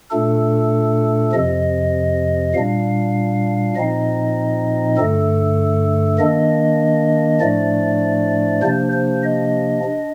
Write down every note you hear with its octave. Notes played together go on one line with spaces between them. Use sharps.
A#2 A3 D4 A4
F2 C3 F3 D#5
A#2 G3 D4 F5
A#2 F3 C4 D#4 D#5
G2 D3 A3 A4
D#3 A#3 D4 D#5
A2 F3 A3 D4 D5
C3 F3 A#3 D4 C5
C5
D#5
D4